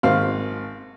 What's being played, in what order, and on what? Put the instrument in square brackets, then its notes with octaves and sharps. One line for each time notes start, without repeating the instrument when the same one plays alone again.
[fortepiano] G#1 C5 F5